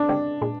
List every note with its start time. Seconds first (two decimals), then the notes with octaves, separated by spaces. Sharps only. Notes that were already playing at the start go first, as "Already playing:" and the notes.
Already playing: D4
0.09 D3 G#3 C4 G4
0.42 A#2 G#3